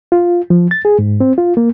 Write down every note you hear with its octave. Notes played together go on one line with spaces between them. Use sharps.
F4
F3
A6
G#4
G#2
C4
F4
A#3